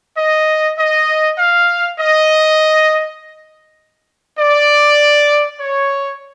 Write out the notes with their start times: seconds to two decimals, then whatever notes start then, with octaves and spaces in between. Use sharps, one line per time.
0.17 D#5
0.77 D#5
1.38 F5
1.98 D#5
4.38 D5
5.59 C#5